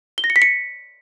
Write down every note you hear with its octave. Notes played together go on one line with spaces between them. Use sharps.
G7
A#6
C#7
B6
C#7